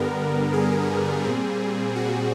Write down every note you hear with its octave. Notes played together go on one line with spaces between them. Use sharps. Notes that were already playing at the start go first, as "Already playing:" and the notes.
Already playing: G2 D3 G3 B3 A#4
G#4
A#2 G3 C4
F#4